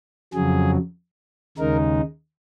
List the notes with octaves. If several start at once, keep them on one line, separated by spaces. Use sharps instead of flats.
F2 C#3 F#3 G#4
D#2 C#3 G#3 D#4 A#4